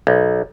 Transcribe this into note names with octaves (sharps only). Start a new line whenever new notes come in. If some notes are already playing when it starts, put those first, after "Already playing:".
B1